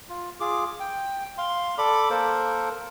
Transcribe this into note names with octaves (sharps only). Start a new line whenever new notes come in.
F4
F4 G#4 D6
G5
F5 C6
A4 D5 B5 D6
A#3 A4 A#4 C5